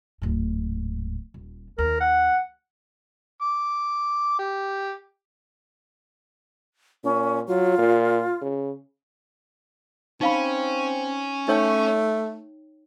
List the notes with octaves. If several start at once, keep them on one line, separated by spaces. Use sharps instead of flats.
D1 G#2
D#1
D#2 A#4
F#5
D6
G4
A#2 C#4
F#3 F4
A#2
C#3
C4 C#4 D#4 F5 B5
A3 D#4 C#5 G5